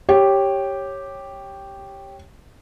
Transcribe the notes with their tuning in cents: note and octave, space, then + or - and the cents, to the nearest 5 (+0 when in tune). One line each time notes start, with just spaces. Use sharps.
G4 +0 C#5 -10